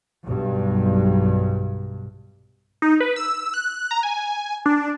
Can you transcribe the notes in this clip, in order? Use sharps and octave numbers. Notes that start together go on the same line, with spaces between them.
B1 G2
D#4
B4
E6
F#6
A#5
G#5
D4